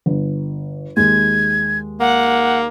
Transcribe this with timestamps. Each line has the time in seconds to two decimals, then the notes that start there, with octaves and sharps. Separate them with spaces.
0.06 G1
0.97 D#2 G#3 G#6
2.00 A#3 F#5